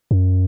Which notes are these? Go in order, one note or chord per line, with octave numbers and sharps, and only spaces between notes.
F#2